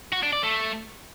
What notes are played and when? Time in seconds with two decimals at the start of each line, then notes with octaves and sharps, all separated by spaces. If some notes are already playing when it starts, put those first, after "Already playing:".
0.13 F#4
0.23 D4
0.33 D5
0.43 A3